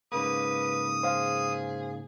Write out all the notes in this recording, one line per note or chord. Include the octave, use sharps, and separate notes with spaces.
G#2 C#3 A#3 B4 D#6
G#4 C5 F5